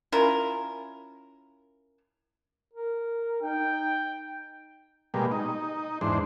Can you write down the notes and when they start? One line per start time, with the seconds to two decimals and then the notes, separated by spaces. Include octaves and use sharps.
0.12 C#4 E4 F4 A#4
2.73 A#4
3.42 D#4 G5
5.14 B2 G3 G#3 A#3
5.31 D#4
6.01 E2 G#2 D4 C5